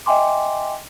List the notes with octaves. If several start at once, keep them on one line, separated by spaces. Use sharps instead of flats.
D#5 E5 G5 G#5 C6 D6